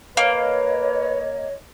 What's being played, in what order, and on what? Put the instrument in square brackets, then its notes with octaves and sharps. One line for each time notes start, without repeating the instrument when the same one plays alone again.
[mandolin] A#3 [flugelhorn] B4 [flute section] C#5 D#5 [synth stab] F5